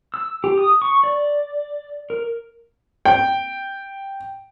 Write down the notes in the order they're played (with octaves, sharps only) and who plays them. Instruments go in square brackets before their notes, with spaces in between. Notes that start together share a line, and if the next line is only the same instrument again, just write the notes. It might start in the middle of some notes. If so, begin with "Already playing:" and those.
[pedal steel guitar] E6
G4
D#6
C#6
D5
A#4
[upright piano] G5